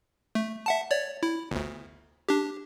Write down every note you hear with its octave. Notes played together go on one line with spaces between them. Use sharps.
A3
E5 F#5 A5
C#5 D5
E4
G1 D2
D4 G4